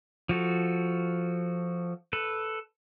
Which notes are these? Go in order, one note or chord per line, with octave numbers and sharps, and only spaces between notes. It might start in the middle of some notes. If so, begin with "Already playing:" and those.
F3 F#4 A4
A4 B4